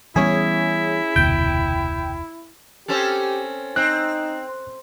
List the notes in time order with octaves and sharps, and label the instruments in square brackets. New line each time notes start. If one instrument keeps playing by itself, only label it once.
[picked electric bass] E3 G3 B3 [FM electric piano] C#4 G#4 [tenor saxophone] E4
[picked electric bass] F1 D2 B2 [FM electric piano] G5
[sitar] C4 C#4 A4 [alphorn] G4
[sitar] C4 [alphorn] D#4 [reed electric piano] F#6